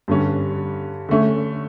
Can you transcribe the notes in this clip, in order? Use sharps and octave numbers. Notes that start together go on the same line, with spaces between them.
G2 D3 G3 C#4
D3 A3 C#4